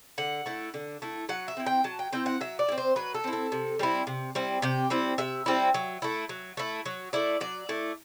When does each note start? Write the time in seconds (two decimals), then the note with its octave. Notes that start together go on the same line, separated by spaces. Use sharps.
0.18 D3 F#5
0.46 A3 E4
0.74 D3
1.02 A3 E4
1.29 F#3 F#5
1.48 E5
1.57 C4 E4
1.66 G5
1.84 F#3 A5
1.99 G5
2.13 C4 E4 G5
2.26 F#5
2.41 F#3 E5
2.59 D5
2.69 E4
2.72 C4
2.78 C5
2.96 F#3 B4
3.14 A4
3.24 C4 E4
3.33 A4
3.52 C3
3.79 G3 C4 E4
4.07 C3
4.35 G3 C4 E4
4.62 C3 G4
4.90 G3 C4 E4
5.18 C3 E5
5.46 G3 C4 E4
5.74 F#3
6.02 A3 E4
6.29 F#3
6.57 A3 E4
6.86 F#3
7.13 A3 E4 D5
7.40 F#3 D5
7.69 A3 E4